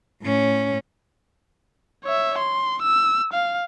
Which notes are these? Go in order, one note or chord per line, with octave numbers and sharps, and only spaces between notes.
A2 C#4
C#5 E5
C6
E6
F5